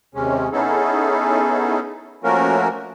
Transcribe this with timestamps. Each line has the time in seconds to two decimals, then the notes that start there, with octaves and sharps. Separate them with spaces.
0.15 D#2 C3 G#3 C#4
0.52 B3 C#4 D#4 E4 G#4 A4
2.24 F3 A3 A#3 C#4 F#4 A#4